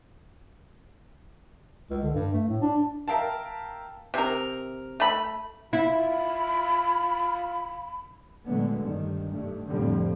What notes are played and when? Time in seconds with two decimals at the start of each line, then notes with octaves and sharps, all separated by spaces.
1.90 C#2
2.03 D3
2.14 G2
2.34 A3
2.48 A2
2.62 D4
3.08 A#4 E5 F5 G5 A5
4.14 C3 A#4
5.00 A3 B5
5.73 E4 F4 B5
8.46 A#2 D3 F#3 G#3 A3 B3
8.79 G2 D#3
9.32 G2 A3
9.68 F2 A2 D3 F3 G3